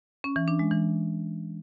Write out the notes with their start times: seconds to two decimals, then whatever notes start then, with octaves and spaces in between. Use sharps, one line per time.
0.24 C#4
0.36 E3
0.48 D4
0.59 G#3
0.71 E3